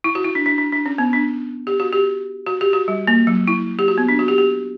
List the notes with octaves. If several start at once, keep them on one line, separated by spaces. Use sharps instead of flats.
E4
F#4
E4
D4
D4
D4
D4
C#4
B3
D4
G4
F#4
G4
F#4
G4
F#4
G3
A#3
F#3
E4
G4
F#4
B3
D4
F#4
G4
G4